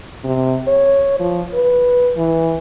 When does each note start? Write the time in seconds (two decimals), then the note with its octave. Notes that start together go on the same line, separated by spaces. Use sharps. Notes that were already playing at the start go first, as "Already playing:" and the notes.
0.24 C3
0.68 C#5
1.20 F3
1.54 B4
2.17 E3